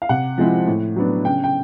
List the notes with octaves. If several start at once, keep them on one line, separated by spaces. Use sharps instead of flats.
F5
C3 F#5
F3 G#3 C4 E4
A2
F#3 B3 D4
C#3 G5
G5